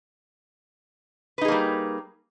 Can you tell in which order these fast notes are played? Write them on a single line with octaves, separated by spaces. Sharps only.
B4 D#4 G#4 A#3 G3